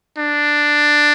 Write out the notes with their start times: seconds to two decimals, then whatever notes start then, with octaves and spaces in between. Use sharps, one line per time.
0.18 D4